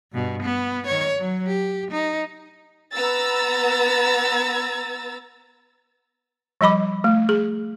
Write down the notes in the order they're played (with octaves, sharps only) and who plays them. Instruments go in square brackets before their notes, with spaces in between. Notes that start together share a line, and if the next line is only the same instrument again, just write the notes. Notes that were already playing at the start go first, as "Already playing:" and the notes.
[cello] G2 B2
B3
D#3 C#5
F#3
G4
D#4
[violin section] B3 A#5 E6 A6
[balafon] F3 G3 D#5 B5 D6
A3
G#4